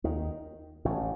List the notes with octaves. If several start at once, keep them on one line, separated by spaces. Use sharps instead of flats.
D#2 D#3
A1 A2